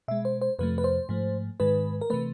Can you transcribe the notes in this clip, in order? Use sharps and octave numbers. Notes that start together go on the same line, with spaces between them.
B2 G#3 E5
C5
C5
F2 C3 F3 A3 B4
B4
C5
G#2 F3 A3
G#2 D#3 G#3 B4
A#4
C3 E3 A3 B4